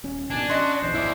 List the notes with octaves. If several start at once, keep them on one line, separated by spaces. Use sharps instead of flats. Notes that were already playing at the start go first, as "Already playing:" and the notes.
D#1 C#4
G#1 B2 D#3 D4 G#5
C#4 F#4 D#5 C6
A#1 E2 E3 C5
E4 D5